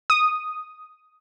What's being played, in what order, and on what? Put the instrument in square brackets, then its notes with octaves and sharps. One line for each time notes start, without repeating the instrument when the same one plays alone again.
[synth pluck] D#6